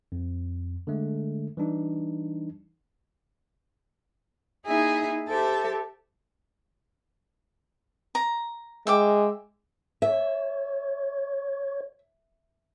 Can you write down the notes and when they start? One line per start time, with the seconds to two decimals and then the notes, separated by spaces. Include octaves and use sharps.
0.12 F2
0.87 D3 G#3 A3
1.57 E3 G3 D4 D#4
4.65 A#3 D#4 E4 G#4 E5
5.29 G4 A4 C5 E5 A5
8.15 A#5
8.87 G#3 E5 G5 D6
10.02 C#5 E5